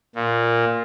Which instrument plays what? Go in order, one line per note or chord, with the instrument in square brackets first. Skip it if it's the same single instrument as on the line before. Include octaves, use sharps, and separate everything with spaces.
[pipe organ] A#2